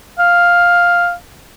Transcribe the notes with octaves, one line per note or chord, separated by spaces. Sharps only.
F5